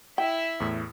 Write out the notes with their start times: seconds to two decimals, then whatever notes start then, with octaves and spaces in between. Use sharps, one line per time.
0.18 E4 E5 G5
0.60 E2 A2